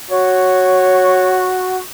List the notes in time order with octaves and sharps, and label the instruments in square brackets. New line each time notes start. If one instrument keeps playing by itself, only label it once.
[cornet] F#4 [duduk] C#5